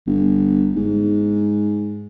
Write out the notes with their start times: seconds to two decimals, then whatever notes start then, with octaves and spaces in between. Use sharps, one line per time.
0.07 G1
0.75 G#2